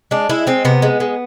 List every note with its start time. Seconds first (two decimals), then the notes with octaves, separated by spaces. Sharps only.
0.11 G#3 D4
0.29 G#3 E4
0.47 G#3 C4
0.65 C3 B3
0.82 G#3
1.00 G#3